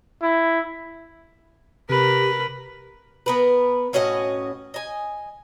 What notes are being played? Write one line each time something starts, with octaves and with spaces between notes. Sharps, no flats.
E4
C3 G4 A#4 B4
B3 A#4 B4
A2 C#4 F#4 D#5
D#5 G#5